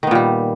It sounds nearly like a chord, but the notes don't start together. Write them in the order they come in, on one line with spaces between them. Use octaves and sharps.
D#3 B3 A#2 G3